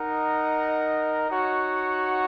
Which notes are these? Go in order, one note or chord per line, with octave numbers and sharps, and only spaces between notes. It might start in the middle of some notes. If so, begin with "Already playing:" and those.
Already playing: D#4 A#4 D#5 F#5
D#4 F#4 C#5 F#5